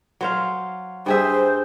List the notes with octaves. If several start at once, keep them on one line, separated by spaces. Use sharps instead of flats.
F#3 C5 F5
G2 G#4 C5 E5